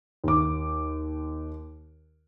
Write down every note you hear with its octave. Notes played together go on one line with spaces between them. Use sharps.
D#2 D6